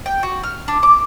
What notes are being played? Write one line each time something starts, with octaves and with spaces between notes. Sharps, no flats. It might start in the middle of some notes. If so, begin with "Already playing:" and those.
G5
F#4
F6
D4
D6